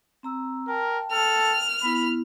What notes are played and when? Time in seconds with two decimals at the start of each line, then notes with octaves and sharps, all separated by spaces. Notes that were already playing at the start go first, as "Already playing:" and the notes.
0.23 C4 A#5 E6
0.68 A#4 G5 A5
1.12 A4 F6
1.83 B3 E4 B5